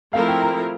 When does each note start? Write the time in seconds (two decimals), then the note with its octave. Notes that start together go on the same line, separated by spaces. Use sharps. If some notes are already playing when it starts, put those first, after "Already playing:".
0.13 F3 A3 C4 E4 A#4 F5
0.28 G5
0.42 A#5